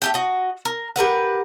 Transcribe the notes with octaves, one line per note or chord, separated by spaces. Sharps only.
A3 G4 G5
F#4 D#5
A#4
G4 A#4 B4 F#5